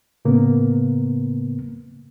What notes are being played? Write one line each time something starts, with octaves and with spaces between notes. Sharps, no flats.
A2 C#3 A#3 B3